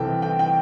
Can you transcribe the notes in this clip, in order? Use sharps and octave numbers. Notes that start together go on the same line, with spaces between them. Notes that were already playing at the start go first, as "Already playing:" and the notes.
Already playing: C2 C3 E3 C4 A4 G5
G5
G5